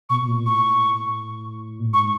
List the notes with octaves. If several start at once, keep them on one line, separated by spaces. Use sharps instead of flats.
B2 C#6
B2
A#2
A2 C#6
A#2
A2
G#2 C#6